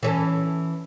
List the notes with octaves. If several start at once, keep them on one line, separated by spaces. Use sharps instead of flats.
E3 C#4 A4